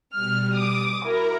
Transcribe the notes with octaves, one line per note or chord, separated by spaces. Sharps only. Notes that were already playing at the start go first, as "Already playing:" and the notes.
B2 G3 F6
D6 D#6
E4 F#4 A#4 A#5 D6